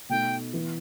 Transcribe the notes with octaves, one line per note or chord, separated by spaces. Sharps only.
B2 A3 D#4 G5
E3 B3 E4